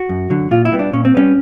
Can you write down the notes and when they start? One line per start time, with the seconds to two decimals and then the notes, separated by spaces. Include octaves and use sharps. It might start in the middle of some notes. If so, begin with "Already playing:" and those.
Already playing: F#4
0.09 F#2
0.30 D3 F#3
0.51 A#2 F4
0.65 E4
0.72 G3 B3
0.79 D4
0.93 A#2 C#4
1.05 C4
1.15 G3 B3 C#4